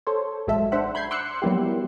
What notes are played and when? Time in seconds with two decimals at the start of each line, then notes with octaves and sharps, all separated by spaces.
0.07 A4 C5 C#5
0.47 A1 F#3 G#3 A4 E5
0.72 D4 C5 E5 F#5
0.95 B5 G6 G#6 C7
1.11 C6 D6 E6 F#6 C#7
1.42 F#3 G3 A#3 B3 E4 G4